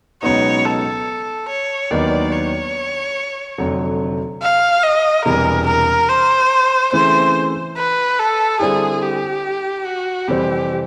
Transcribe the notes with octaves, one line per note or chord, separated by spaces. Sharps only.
C#2 B2 F#3 B3 D#4 C#5
A4
C#5
D#2 D#3 F#3 B3 D4 D5
C#5
F1 F2 D3 F#3
F5
D#5
E1 E2 C3 E3 G3 A#4
A#4
C5
C#3 E3 A3 C4 E4 C5
B4
A4
D3 G3 C4 E4 G#4
G4
F#4
F2 C3 E3 G3 C4 G4